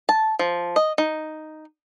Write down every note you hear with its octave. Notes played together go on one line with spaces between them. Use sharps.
A5
F3
D#5
D#4